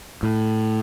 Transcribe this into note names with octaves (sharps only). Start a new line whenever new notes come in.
A2